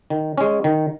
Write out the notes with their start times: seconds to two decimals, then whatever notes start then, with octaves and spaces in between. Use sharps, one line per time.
0.10 D#3
0.38 G#3 C#4
0.64 D#3